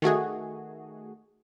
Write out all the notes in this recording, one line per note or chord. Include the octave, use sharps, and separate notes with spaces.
D#3 A3 F#4 G#4